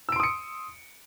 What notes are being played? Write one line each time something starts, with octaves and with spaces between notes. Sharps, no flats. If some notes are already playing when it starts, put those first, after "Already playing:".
C6 D#6 E6 C#7 D7